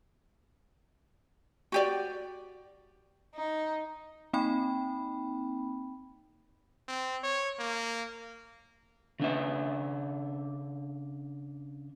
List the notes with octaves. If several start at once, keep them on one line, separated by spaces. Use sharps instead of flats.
F#4 G4 D5
D#4
A#3 C4 D#4 G5 B5
C4
C#5
A#3
C#3 D4 E5